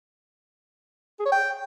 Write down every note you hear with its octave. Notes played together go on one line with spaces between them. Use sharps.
G#4
C#5
G5